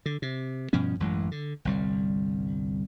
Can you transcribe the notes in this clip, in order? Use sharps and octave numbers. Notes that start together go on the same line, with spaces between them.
D3
C3
G2 B2 F3 C#4
A1 F#2 E3 G#3
D3
G1 C2 G3